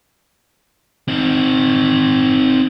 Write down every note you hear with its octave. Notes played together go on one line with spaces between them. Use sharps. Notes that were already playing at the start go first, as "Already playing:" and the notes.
C4 D#4